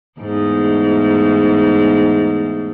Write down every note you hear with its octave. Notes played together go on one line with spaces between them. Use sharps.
E2 G#2 A3